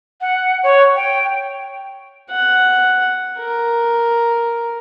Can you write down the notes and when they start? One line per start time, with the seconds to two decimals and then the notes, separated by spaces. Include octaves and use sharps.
0.21 F#5
0.63 C#5
0.96 G5
2.31 F#5
3.39 A#4